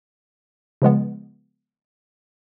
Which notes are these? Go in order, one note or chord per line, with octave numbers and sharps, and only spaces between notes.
C#3 F3 G#3 B3